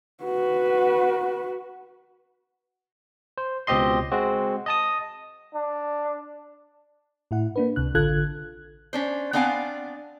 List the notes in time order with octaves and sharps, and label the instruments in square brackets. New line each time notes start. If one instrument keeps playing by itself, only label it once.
[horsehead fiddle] F#4 B4
[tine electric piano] C5
C#2 B2 C4 G4 D#5 C6
G#3 C4 F#4
D#5 A5 D#6
[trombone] D4
[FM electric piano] A2 E4 F#5
A#3 D4 B4
C#2 C3 F#6
A1 D3 F4 A4 F#6 G#6
[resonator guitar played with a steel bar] C#4 D4 C5
B3 C4 D4 F5 F#5 G#5